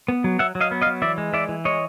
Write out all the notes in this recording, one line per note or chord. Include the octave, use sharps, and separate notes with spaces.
B3
F#3
F#3 E5 F#5
F#3
D#5 F5
B3
D#5 F5
F#3
E3 D5 E5
G#3
E3 D5 E5
E3
G#3 C#5 D#5